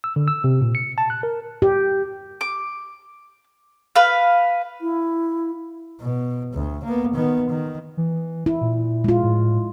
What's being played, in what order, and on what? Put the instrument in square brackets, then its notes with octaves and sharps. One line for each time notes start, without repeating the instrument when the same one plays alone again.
[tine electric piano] E6
D3
E6
C3
A#2
C#7
A5
F#6
A#4
[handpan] G4
[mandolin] D6
B4 F5
[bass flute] E4
[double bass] B2
D2
A#3 B3
D#3 B3
D#3
[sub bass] E3
[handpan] E4
[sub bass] A#2
[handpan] G#3 F4
[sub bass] A2